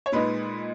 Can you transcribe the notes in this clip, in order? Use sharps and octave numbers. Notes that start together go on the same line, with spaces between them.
C#5
A#2 G#3 D#4 B4